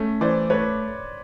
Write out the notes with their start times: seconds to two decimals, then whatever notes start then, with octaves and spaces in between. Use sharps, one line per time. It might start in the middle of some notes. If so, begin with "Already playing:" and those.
Already playing: A3 C#4
0.21 E3 C5 D5
0.50 A3 B4 C#5